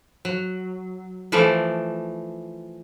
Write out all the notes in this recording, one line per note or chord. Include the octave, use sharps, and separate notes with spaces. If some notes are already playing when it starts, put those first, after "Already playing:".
F#3
E3 F3 A3 D5